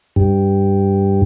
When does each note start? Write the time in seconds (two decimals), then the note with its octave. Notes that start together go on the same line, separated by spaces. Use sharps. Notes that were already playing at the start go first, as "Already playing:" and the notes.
0.16 G2